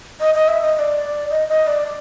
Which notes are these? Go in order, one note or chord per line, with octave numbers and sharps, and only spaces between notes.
D#5
D#5
E5
D#5
D#5
D5
D#5
D#5
D5
D5